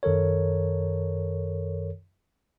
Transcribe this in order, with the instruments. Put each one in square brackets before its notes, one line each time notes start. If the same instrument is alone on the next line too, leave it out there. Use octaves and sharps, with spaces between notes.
[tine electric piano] F#2 D#3 A4 A#4 C#5